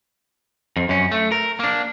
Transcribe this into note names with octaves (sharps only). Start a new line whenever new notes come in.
F2
F#2 C#4
A3
A#4
A#3 D4